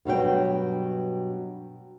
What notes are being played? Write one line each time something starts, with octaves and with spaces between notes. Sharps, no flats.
G2 B2 F#3 G5